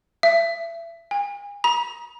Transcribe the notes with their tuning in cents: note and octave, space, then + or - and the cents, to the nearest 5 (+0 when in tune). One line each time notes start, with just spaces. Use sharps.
E5 +30
G#5 -40
A#5 +40